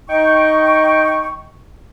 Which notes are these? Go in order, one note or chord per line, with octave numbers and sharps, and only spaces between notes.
D#4 G5 C#6